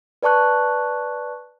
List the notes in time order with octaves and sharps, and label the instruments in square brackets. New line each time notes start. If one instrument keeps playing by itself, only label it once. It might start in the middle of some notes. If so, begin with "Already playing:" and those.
[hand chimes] B4 D5 A5 C#6 F#6